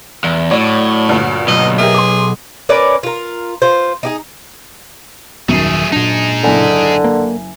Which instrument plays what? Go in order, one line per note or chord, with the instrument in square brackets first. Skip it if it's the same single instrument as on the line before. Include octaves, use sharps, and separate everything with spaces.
[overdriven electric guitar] E2
[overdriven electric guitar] A2 [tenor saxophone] F#3 [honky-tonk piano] C#5 D5
[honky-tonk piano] D2 G2 A#2
[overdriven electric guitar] B1 [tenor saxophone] D#5
[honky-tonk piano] G4 A#4 E5 [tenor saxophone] G#4
[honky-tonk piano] C6 D6
[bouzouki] C#4 A#4 B4 D5
F4 A#4
F4 C5
D#4 G4 G#4
[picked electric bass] D#1 D#3 [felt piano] F#2 C7 [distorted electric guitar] A3 G#4
[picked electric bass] A#2 D4 [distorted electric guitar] D#4 G#4
[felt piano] F#1 E4 G#5 [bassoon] D3
[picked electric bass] A#3